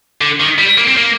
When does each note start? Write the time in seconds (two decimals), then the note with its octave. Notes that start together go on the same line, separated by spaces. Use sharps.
0.21 D3
0.40 D#3
0.58 G3
0.78 A#3
0.87 C4
0.97 A#3